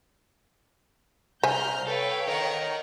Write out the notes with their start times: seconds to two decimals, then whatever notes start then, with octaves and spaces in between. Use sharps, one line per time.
1.43 C2 C5 E5 G#5 A#5 F6 G6
1.87 A4 B4 C#5 F5 G5
2.28 D#4 A#4 F#5 A#5